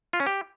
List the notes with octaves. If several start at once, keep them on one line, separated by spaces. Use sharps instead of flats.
F4
C#4
G4